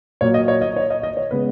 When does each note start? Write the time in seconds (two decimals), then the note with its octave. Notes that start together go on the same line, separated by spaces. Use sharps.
0.21 A#2 F#3 A#3 C#5
0.34 D#5
0.48 C#5
0.62 D#5
0.76 C#5
0.90 D#5
1.03 D#5
1.17 C#5
1.31 C#3 G#3 B3 B4